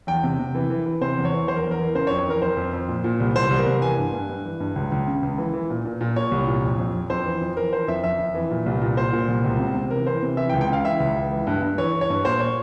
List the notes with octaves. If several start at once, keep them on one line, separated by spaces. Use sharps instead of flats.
E2 G5
C3
C3
E3
E3
E3
C3 C5
E2
C#5
E3
E2 C5
A#4
E2
A#4
E3
C#3 C5
C#5
F2
C#5
E3 A#4
F2 C5
F2
F2
A#2
A#2
C2
C2 C5
C2
A#4
C2
E3 G#5
G2
G2
G2
E3
G2
C#2
C#2
C#3
C#2
E3
E3
A#2
A#2
A#2
A#2 C#5
C2
A#2
F2
F2
F2
F2 C5
E3
F2
E3 A#4
E3 C5
F2 E5
F2 E5
F2
E3
A#2
C2
A#2
A#2 C5
A#2
C2
C#2
C3
C3
E3 A#4
E3 C5
C3
E3 E5
G5
C#2
G5
C#3 F5
E3 E5
C#2
C#2
E3
G2
G2
E3 C#5
E3
C#5
G2
A#2 C5
C#5